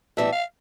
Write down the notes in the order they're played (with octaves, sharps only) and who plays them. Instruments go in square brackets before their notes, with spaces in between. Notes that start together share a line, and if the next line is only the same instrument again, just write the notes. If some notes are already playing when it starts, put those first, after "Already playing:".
[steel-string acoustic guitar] A2 E3 G3 B3 [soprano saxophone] E5
[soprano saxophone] F5